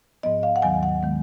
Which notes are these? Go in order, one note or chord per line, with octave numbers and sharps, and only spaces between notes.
G#2 F3 B3 D#5
F5
F#5
D#2 D#3 F#3 B3 G#5
F#5
D#3 G#3 B3